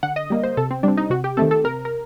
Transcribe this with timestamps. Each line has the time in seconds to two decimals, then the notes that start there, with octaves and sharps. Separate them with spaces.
0.03 D3 F#5
0.16 D#5
0.30 G3 A#3
0.43 C5
0.57 C3 A4
0.71 C4
0.83 G3 C4 D4
0.97 D#4
1.10 C3 F#4
1.24 G4
1.37 D#3 A3 C4 A4
1.51 A4
1.64 C3 A#4
1.85 A#4